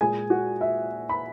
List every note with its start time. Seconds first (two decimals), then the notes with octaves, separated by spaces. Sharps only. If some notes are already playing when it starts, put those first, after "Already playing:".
0.01 A#2 G#3 G#4 G#5
0.30 F#4 F#5
0.61 E5
1.09 B5